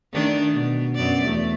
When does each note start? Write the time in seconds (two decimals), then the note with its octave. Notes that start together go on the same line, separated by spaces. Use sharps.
0.13 D#3 A3 D4
0.52 B2
0.95 F#2 B3 D5
1.24 E2 A3